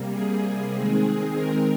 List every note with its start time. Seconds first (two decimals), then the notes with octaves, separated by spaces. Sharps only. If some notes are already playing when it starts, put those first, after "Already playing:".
Already playing: C3 G3 A#3
0.12 G#4
0.73 D#3 G#3 C4 G#4
1.35 A#4